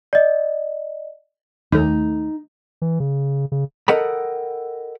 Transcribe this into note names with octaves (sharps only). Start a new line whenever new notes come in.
D5 D#5
D#2 A3 D#4
E3
C#3
C#3
A4 A#4 D#5 F#5 G5 B5